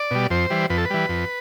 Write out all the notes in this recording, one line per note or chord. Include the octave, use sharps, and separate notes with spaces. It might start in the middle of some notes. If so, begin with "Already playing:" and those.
Already playing: D5
B2 G3
F2 C5
E3 G3
F2 B4
A4
B4
E3 G3
F2